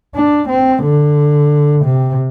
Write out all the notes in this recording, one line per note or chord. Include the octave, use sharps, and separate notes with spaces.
D4
C4
D3
C3